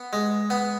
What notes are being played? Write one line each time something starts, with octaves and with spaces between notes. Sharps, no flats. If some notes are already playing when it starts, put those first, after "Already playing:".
Already playing: B3
G#3
B3